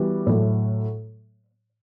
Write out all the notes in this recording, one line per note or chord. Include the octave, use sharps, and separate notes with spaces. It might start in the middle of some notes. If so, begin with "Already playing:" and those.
Already playing: E3 G3 B3 F#4
A2 F#3 A3